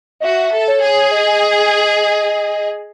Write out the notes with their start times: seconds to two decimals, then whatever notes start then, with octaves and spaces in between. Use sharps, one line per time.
0.20 D#5
0.24 F#4 E5
0.54 A4
0.68 C#5
0.82 G#4
1.11 D#5